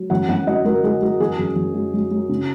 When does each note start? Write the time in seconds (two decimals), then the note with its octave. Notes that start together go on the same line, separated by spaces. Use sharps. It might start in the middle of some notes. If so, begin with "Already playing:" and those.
Already playing: F#3
0.10 F#2 F#5
0.29 F#2 F#5
0.47 F#3 D#5
0.65 F#3 A#4
0.83 F#3 G#4
1.01 F#3 F#4
1.20 F#2 G#4
1.39 F#2
1.56 F#2
1.74 F#3
1.94 F#3
2.11 F#3
2.29 C#3